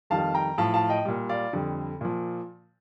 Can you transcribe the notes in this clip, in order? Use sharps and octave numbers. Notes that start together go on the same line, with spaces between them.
F2 D#3 G3 F5 A5
G5 A#5
A2 F3 F5 A5
F5 A5
D#5 G5
A#2 G3
D5 F5
F2 D3 G3
A#2 F3